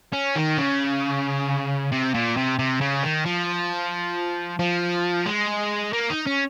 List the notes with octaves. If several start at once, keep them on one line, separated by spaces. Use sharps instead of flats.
C#4
D#3
C#3
C3
A#2
C3
C3
C#3
D#3
F3
F3
G#3
A#3
D#4
C#4